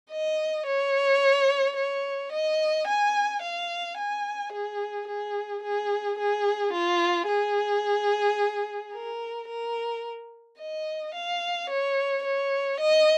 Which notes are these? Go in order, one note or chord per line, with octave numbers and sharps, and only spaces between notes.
D#5
C#5
C#5
D#5
G#5
F5
G#5
G#4
G#4
G#4
G#4
F4
G#4
A#4
A#4
D#5
F5
C#5
C#5
D#5